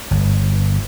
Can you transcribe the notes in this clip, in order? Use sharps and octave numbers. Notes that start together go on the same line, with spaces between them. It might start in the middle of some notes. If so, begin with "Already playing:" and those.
G1